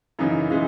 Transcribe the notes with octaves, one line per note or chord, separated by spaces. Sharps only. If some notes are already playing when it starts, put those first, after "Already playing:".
F#2 C#3 E3 D#4
C#3 E3 G#3